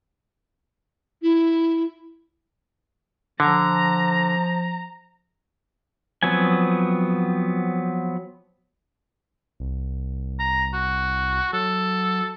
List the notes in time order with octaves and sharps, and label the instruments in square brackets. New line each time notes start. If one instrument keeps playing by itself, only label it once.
[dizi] E4
[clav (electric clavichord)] D3 [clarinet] F3 [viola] A#5
[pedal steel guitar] F3 F#3 B3 C4 G#5
[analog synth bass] C2
[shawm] A#5
F#4
[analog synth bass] F#3 [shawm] A4